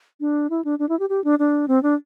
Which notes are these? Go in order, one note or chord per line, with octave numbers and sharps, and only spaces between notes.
D4
E4
D4
D4
E4
G4
G4
D4
D4
C4
D4